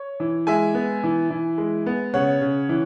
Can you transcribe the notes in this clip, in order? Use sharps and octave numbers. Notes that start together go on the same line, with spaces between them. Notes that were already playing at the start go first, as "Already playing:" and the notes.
Already playing: C#5
E3
G#3 E5 G#5
B3
E3
E3
G#3
B3
C#3 C#5 F#5
C#3
E3